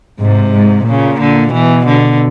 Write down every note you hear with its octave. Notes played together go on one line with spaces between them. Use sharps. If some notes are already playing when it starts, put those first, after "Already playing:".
G#2 C3
G#2
A#2 C#3
D3
B2 E3
D3